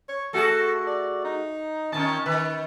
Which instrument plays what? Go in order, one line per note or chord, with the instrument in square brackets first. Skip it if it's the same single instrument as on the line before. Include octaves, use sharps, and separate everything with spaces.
[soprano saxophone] C#5
[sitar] A3 F#4 G#4 [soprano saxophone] A4
[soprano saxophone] D5
D#4
[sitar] E2 D#3 C#4 [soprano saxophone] A5
[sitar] D#3 [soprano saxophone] B4